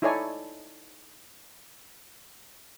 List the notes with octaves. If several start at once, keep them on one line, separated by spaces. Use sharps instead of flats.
D#4 E4 A4 C#5 D5 G#5